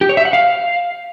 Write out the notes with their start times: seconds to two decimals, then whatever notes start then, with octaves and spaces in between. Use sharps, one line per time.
0.01 G4
0.09 C#5
0.17 E5
0.25 F#5
0.33 F5